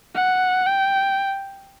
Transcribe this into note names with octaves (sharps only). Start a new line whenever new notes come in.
F#5
G5